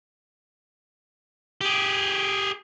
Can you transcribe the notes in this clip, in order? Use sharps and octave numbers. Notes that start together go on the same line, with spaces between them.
G4 G#4